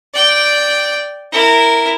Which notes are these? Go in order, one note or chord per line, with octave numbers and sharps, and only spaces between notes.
D5 G5
E4 A#4